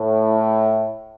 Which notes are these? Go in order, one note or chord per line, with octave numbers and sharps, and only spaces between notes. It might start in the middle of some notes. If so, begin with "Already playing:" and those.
Already playing: A2